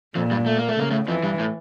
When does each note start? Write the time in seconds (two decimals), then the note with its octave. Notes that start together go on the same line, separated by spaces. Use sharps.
0.15 F2 A#2 F3
0.31 G2 G3
0.46 A3
0.58 A#3
0.68 A3
0.78 C#3 A#3
0.91 A2 A3
1.08 F2 E3 F3
1.23 G2 G3
1.39 A2